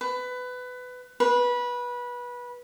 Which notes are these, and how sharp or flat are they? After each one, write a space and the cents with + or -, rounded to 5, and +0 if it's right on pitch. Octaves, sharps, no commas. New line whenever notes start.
B4 +20
B4 -20